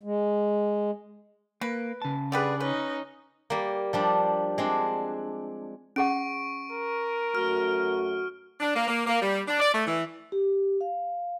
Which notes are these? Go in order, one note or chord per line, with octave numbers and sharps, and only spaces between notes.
G#3
A#3 B4
C#3 A5
D3 G3 G#4 B4 D5
C#4 D#4 B4
G3 A#3
F3 G3 D4
G#3 C4 D4
C#4 G#4 F#5 C#6 D7
A#4
F#2 A3 F#4 F6
D4
A#3
A#3
A#3
G3
D4
D5
A3
E3
G4
F5